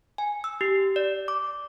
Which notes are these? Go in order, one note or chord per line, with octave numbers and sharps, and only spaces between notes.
G#5
E6
G4
D5
D6